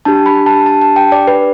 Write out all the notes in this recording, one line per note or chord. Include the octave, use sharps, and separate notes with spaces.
D4 G4 A5
B5
A5
A5
A5
G5
D5
B4